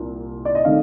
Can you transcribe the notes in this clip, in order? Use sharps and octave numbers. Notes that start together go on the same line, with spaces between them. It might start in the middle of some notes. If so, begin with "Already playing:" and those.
Already playing: C2 A#2
D5
D#5
D#3 A3 C4 F5